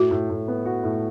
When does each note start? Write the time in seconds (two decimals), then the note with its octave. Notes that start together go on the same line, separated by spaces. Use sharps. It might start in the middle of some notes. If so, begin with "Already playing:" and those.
Already playing: A2 F#4
0.11 A2
0.30 A2
0.48 B3
0.66 F#4
0.84 A2